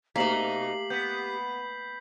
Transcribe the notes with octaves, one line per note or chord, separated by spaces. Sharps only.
B2 A3 A#3 D#4 G4 B6 C7 F#7
B3 G6 B6